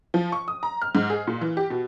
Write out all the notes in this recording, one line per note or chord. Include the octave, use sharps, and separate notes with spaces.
F3
C#6
D#6
A#5
F6
G#2
G#4
A#2
E3
G4
B2